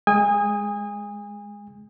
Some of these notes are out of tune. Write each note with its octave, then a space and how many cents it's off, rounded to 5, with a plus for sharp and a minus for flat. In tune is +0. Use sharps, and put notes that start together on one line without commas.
G#3 +0 G#5 -30 D#6 +5